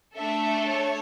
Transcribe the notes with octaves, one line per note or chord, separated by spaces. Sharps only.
A3 D4 A4 E5
C#5